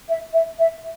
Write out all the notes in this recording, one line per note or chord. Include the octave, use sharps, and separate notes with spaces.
E5
E5
E5